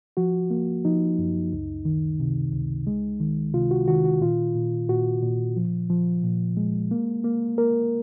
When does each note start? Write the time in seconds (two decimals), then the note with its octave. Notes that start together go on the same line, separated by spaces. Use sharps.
0.17 F3 F#4
0.50 A#3
0.85 F3 D#4
1.19 F#2
1.53 C#2
1.85 D#3
2.20 C3
2.53 C#2
2.87 G#3
3.20 D#3
3.54 C3 F4
3.71 F#4
3.88 D#3 F#4
4.05 F#4
4.21 A#2 F4
4.55 A#2
4.89 A#2 F#4
5.23 A#2
5.57 F3
5.90 F3
6.24 A#2
6.57 G#3
6.91 A#3
7.24 A#3
7.58 A#3 A#4